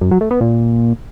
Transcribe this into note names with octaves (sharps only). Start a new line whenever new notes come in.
F#2
F#3
A3
B3
A#2